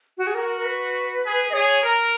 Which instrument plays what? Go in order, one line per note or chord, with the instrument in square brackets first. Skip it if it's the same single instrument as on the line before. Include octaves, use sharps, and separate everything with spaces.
[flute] F#4
G#4
[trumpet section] F#4 [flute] A#4
[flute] A#4
B4
[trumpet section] G#4
[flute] D#5
[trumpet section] G#4 [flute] C#5
[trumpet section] A#4